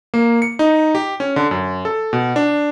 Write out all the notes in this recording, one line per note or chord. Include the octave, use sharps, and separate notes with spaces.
A#3
C#7
D#4
G4
C#4
D3
F#2
A4
B2
D4